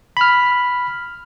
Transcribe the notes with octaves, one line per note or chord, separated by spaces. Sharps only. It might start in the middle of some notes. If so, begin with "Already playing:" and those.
B5 F6